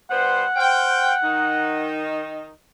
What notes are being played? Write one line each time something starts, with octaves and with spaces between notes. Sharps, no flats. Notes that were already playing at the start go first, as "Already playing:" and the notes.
G2 B3 C5 F#5
C5 F5 G5
D#3 D#4